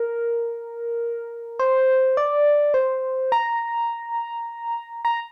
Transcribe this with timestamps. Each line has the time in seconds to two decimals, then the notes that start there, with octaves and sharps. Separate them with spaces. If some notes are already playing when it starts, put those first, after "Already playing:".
Already playing: A#4
1.59 C5
2.17 D5
2.74 C5
3.32 A#5
5.05 A#5